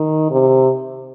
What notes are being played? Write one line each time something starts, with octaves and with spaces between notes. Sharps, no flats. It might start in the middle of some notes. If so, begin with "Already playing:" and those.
Already playing: D#3
C3